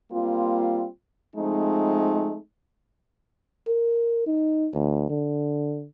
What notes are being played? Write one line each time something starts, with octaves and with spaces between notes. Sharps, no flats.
G3 A#3 C4 F4
F3 G#3 A3 C4 D#4
A#4
D#4
D2
D3